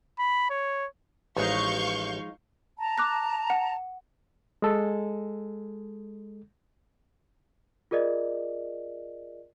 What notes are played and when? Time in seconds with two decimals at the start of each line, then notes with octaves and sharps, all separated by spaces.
0.19 B5
0.50 C#5
1.37 A1 F3 G#3 D#4 F5 C#6 G6
2.78 A5 A#5
2.98 D6 F#6 A#6
3.50 F#5
4.62 G#3 A4
7.91 F4 G#4 A#4 D5 D#5